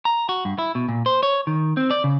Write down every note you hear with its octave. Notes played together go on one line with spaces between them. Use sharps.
A#5
F#4
G2
E4
B2
A#2
C5
C#5
D#3
C4
D5
C#3